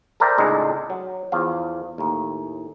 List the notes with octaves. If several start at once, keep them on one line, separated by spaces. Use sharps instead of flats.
A4 A#4 C5 D5 E5 G5
C#2 A2 G#3 D4 D#4 D#5
F#3
E2 F3 F5
D#2 A2